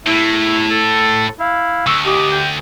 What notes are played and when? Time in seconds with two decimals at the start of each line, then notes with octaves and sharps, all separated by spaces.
0.06 A2 E4 E5
0.70 A4
1.40 E4 F5
1.87 D2 C#6 E6
2.06 G4 D#5
2.31 G5